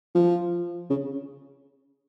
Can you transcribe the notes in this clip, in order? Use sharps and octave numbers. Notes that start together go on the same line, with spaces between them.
F3
C#3